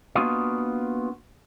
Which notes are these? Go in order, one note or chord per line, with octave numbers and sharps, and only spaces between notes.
A#3 B3 D4 F4 F#4 D#5